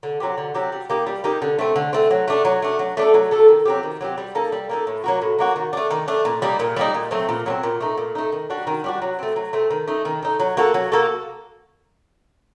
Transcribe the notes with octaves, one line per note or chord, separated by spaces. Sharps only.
D3
F#3 C4 G4
D3
F#3 C4 G4
G3
A#3 D#4 G4
G3
A#3 D#4 G4
D3
A3 C4
D3
A3 C4
F#3
A3 D4
F#3
A3 D4
F#3
A3 D4 A4
F#3
A3 D4 A4
D#3
F#3 C4 G4
D#3
F#3 C4 G4
G3
A#3 D#4 A4
G3
A#3 D#4 A4
A2
F#3 A#3 F#4
A2
F#3 A#3 F#4
D#3
A3 D4
D#3
A3 D4
A#2
G3 A#3 D#4
A#2
G3 A#3 D#4
A#2
F#3 A3 C4
A#2
F#3 A3 C4
A#2
A3 D#4
A#2
A3 D#4
D#3
G3 D4 F#4
D#3
G3 D4 F#4
F#3
A3 C4
F#3
A3 C4
D#3
A3 D#4
D#3
A3 D#4
F#3
A#3 F#4 A4
F#3
A#3 F#4 A4